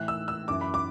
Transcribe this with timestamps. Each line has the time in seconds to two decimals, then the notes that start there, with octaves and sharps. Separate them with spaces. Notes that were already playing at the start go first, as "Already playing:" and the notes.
Already playing: A2 E3 F#6
0.08 E6
0.28 E6
0.48 F#2 E3 D6
0.61 B5
0.74 D6